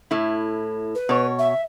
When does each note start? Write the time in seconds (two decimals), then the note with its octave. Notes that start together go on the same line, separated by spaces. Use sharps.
0.11 A2 E4
0.95 B4
1.09 B2 C#5
1.39 E5